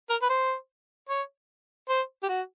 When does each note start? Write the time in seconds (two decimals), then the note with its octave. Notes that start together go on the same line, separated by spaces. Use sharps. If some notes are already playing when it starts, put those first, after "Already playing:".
0.09 A#4
0.22 B4
0.29 C5
1.09 C#5
1.89 C5
2.23 G4
2.29 F#4